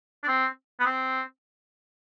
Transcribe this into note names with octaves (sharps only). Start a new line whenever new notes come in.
D4
C4
B3
C4